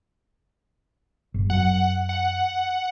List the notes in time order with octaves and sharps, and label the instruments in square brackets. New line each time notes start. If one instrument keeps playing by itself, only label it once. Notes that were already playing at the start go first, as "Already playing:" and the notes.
[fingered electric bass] G1
[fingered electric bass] F#2 [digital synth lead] F#5
[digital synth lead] F#5